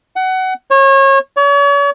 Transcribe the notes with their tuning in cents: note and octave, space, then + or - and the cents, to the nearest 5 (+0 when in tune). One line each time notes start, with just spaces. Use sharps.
F#5 +20
C#5 -30
C#5 +40